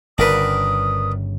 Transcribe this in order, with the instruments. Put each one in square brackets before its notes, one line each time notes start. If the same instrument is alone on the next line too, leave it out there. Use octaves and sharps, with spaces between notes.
[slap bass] G1 C#3 [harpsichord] D4 A#4 B4 [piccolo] D#6